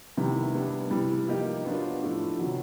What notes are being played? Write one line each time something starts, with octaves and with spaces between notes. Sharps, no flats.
C3 D#3 G3 B3 E4
G3 B3 D4
C3 E3 G3
F3 A#3 D#4 G4
F#3 B3 D4 F4
A2 F3 A3 D4
C3 D#3 F#3